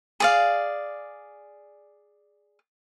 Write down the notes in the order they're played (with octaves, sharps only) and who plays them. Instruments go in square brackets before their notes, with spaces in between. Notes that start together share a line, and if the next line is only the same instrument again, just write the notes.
[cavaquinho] G#4 D5 F5